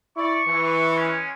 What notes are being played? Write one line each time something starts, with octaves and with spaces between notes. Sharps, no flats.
E4 D5 C#6
E3
G#3 C#4